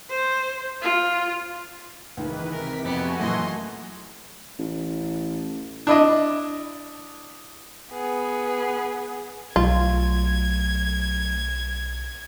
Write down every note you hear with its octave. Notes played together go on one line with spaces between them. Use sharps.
C5
F4
C#2 G#2 D#3 E3 B4
C3 A#4 B6
F2 A3 B3 F#4 G4 G#5
F#2 A#2 E3 D#5 C6
A1
D4 E4 D#5
B3 G#4
B1 F#3 A3 F4 G#6